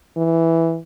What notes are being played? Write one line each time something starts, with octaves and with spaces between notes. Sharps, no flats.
E3